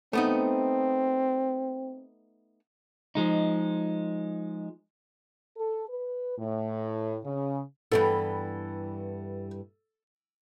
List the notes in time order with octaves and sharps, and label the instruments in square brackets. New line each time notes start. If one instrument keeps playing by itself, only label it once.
[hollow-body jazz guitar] A3 B3 D#4 [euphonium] C4
[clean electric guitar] F3 G#3 D#4
[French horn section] A4
B4
A2
C#3
[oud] G2 E3 B3 [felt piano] A4